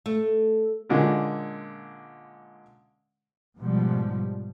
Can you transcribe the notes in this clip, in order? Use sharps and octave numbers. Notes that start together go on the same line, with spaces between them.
A3
A#2 D3 G#3 A#3 C#4
G#2 B2 F3 G3